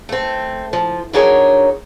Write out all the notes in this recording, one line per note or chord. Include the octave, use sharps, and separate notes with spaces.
A3 C4
F3
F#3 D4 D#4 G#4 A#4 C#5